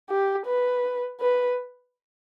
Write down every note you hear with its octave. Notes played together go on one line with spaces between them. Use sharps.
G4
B4
B4